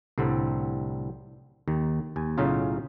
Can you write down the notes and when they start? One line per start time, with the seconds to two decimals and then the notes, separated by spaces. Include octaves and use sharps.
0.18 C2 A2 D3 G3 C4
1.68 D#2 D#3
2.16 D#2 G#5
2.38 B1 A2 C#3 C#4 D#4 F4